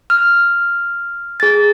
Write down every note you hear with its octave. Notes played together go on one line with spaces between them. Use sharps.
F6
G#4 A6